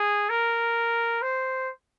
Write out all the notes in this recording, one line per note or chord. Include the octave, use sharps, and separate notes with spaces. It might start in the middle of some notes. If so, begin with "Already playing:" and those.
Already playing: G#4
A#4
C5